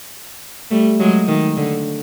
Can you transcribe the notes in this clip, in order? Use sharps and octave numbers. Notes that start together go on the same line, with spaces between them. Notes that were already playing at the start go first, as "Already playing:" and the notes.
G3 A3
F#3 G#3
D#3
D3